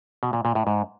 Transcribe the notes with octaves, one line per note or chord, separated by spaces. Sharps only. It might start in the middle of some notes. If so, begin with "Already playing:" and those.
B2
A#2
A#2
A2
G#2